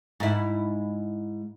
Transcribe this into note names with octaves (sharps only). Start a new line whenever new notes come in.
G#2 E4